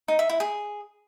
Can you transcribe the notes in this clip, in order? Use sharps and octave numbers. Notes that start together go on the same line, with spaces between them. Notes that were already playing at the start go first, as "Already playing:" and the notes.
D#4
E5
E4
G#4